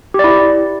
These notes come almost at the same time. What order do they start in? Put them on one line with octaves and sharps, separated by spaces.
G4 D5 E4